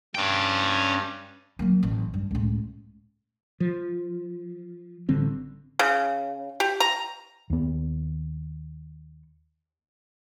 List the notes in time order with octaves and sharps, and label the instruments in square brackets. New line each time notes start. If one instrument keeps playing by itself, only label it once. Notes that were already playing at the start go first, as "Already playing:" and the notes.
[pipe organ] G2 [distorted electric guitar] C#4 G5
[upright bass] F#3 A#3
A1
G2
C#2 A2
[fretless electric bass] F3
A1 D3 G3 C4
[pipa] C#3
G4
A#5
[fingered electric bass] D#2 B3